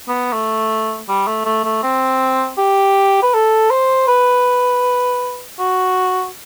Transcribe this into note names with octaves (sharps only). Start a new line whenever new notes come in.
B3
A3
G3
A3
A3
A3
C4
G4
B4
A4
C5
B4
F#4